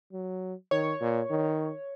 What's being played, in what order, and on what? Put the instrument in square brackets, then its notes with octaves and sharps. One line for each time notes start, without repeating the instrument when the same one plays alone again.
[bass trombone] F#3
[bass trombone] D#3 [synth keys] C#5
[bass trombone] A#2
D#3